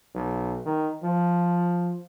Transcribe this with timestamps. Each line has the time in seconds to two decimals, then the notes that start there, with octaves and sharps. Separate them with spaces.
0.15 B1
0.65 D#3
1.03 F3